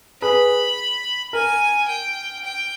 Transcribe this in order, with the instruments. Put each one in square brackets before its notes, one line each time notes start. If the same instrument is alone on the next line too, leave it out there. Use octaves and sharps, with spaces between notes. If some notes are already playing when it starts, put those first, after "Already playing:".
[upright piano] G#4 B4 [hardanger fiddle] B5
[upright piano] A#4 [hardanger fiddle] G#5
[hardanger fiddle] G5
G5